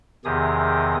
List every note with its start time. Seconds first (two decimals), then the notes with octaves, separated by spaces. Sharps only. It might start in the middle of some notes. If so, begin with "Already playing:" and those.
0.25 E2 C3 D#3 G4 G#4 D#6